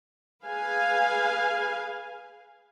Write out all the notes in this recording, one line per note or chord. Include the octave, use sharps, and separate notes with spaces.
G#4 B4 F5 G#5